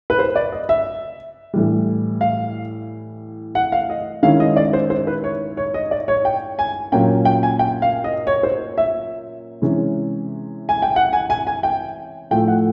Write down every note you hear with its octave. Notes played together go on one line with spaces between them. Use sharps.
B4
C5
D5
D#5
E5
A2 E3 G3
F5
F#5
F5
D#5
D#3 G#3 C#4 E4 F5
D#5
D5
C5
C5
B4
C#5
C#5
D#5
D5
C#5
G5
G#5
A#2 F#3 A#3 C#4 G5
G5
G#5
G5
F5
D#5
C#5
C5
E5
C3 E3 G#3 C#4
G#5
G5
F#5
G#5
G#5
G#5
G5
A2 F3 A3 G5
F#5